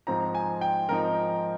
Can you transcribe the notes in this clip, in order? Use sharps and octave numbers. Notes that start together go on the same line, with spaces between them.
G#2 F3 C4 D#4 A#5
G#5
G5
G#2 F3 C4 D#4 A#4